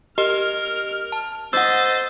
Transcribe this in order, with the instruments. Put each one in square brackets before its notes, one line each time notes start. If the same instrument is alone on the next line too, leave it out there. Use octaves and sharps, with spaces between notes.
[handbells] G4 D#5 [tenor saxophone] A#4 [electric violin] F6
[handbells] A5
[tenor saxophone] C5 [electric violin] D#5 A6 [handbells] F#5 E6